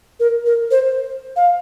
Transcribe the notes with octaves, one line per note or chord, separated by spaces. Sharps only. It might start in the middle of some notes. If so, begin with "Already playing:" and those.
A#4
A#4
C5
F5